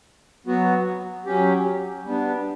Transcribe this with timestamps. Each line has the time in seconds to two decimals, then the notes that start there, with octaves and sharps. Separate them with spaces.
0.46 F#3 B3 F#4
1.26 F#3 C#4 G4
2.04 G3 B3 D4